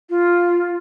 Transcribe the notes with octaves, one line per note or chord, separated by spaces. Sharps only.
F4